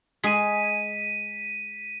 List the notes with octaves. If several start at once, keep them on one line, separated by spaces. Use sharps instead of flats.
G#3 G#4 B6 D#7